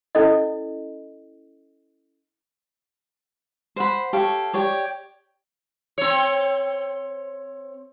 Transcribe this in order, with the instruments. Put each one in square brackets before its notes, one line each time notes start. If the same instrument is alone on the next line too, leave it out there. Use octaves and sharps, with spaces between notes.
[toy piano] C#4 E4 A4 D5 D#5
[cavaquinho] C5 F#5 B5
G4 A4 C#5 F5
G4 C#5 D5
[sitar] C4 C#5